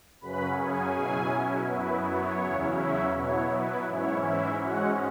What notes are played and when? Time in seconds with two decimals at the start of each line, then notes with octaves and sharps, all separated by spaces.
0.21 F#2 C#3 F#3 C#4 B4 B5
0.57 G#4 G#5
0.94 B2 F#3 C#4 E4
1.67 F#2 F#3 B3 E4 B4
2.05 C#5
2.41 E2 C#3 F#3 C#4 E4
2.77 E4 E5
3.14 B2 F#3 B3 E4 C#5
3.50 B4
3.87 G#2 E3 C#4 E4 C#5
4.23 E4 E5
4.60 G#2 G#3 C#4 F#4 F#5